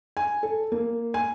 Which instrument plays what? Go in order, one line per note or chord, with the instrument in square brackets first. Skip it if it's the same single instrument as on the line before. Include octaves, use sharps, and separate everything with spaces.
[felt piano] G#5
A4
A#3
G#5